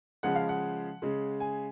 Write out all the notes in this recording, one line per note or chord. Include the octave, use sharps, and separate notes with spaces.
C#3 F3 G#3 F#5
F5
F#5
C#3 G#3
G#5